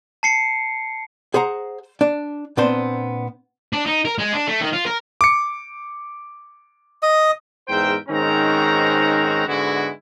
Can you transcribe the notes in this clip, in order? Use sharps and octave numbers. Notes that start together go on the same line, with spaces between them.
A5 C7 C#7
G#4 C5 F#5 A#5
D4
A#2 B3 C4 D4 C5
D4
D#4
A#4
G#3
D4
A3
D#3
F4
A#4
D6 C#7
D#5 D#6
E2 G#2 A#4 C5 E5 G5
G#2 D#3 C4 C#4 F#4 A#5
G#2 D3 G#3 B3 E4 F#4